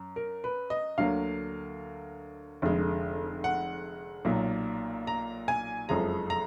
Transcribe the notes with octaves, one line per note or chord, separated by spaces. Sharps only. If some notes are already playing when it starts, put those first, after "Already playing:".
Already playing: F#2
A#4
B4
D#5
D2 D3 F#3 A#3 F5
F1 F2 D3 G#3
F#5
B1 A#2 F#3
A#5
G#5
F#1 F2 F3 G#3 A#5
A#5